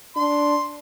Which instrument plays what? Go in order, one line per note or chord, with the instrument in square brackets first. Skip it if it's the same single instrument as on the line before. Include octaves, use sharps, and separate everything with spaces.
[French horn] D4 [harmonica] C6